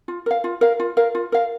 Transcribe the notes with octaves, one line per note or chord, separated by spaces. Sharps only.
F4
A#4 F5
F4
A#4 F5
F4
A#4 F5
F4
A#4 F5